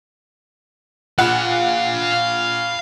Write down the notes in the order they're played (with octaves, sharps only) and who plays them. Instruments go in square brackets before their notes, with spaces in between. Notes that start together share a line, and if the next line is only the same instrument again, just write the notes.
[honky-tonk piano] A#2 F#5 F#6 [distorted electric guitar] F5 B5